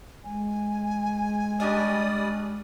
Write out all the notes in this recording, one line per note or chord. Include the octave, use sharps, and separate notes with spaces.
G#3 G#5
G3 C#4 D4 D5 D#5 D#6